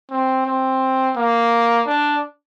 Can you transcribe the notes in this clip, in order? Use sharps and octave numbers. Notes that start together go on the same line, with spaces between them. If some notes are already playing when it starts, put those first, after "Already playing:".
C4
C4
A#3
D4